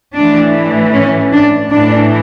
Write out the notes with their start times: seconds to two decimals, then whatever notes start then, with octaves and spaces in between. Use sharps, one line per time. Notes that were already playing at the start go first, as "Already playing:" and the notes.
0.14 A2 E3 D4
0.93 C#4
1.32 D4
1.70 A2 E3 D4